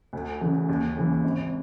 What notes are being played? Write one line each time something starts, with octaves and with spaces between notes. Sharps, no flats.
D2
C#3 E3
D#2
C#3 E3
G#1